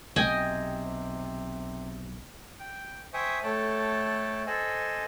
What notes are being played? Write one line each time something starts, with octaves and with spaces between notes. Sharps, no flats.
B1 C3 D#5 G5 G#5
G5
C5 E5 G5 G#5 C#6 D#6
A3 A4 C#5 G5 A5 F#6
A4 C5 D#5 F#5 G#5 E6